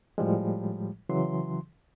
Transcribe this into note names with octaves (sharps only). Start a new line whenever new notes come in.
A2 F3 G3 G#3
C#3 E3 F#3 C6